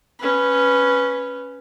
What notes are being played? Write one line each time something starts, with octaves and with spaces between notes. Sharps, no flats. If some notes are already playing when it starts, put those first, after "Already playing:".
C#4 B4